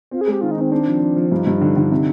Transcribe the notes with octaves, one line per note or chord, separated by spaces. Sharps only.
C4 F4
G#4
G#3 G4
D#3 F4
D#4
D#3 C4
C4 D4
F3
F3
F3
G2 D#4
G2
D3
D3
C3